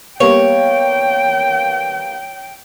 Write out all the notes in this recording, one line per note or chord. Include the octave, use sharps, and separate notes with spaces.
G3 A#3 B3 C#5 G5